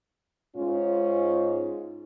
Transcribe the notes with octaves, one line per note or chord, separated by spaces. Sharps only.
G#2 C#4 F4